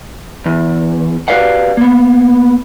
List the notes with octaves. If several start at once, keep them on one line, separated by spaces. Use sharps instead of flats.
E2
F#4 G4 B4 D5 F5 F#5
A#3 B3